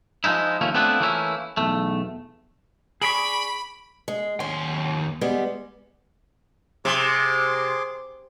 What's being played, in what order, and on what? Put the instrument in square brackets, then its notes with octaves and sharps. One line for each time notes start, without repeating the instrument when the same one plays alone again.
[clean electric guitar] F3 G#3 D#4 E4
D#2 F3 A3 A#3 C#4
A3 B3 C4 D4 E4 F4
E3 A3 A#3 C#4 E4
B1 E2 A3
[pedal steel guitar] G#4 D5 C#6 [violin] B5 [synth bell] B6 D7 F#7
[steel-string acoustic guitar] G#3
[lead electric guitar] D#2 C6 [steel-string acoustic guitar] C#4
[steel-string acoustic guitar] G3 G#3 B3
[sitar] C3 [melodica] G#4 C6 D6